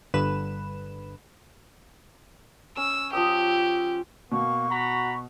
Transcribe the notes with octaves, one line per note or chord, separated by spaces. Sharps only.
G1 G2 D3 B4 E7
C#4 E6
F3 G4 D#6 E6
B2 A#3 C#6
F#4 A#5 B5